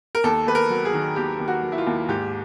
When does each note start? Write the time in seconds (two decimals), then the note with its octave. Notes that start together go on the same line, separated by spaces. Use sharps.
0.15 A#4
0.24 D#2 A4
0.47 D#2 B4
0.55 A#4
0.70 F#3
0.85 G#4
0.94 D#3
1.16 D#2 G4
1.40 D#2
1.48 F#4
1.63 F#3
1.72 E4
1.78 F4
1.87 D#2
2.09 G#2 G4